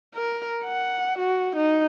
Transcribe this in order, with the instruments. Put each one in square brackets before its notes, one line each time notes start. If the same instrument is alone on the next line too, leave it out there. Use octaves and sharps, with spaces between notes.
[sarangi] A#4
F#5
F#4
D#4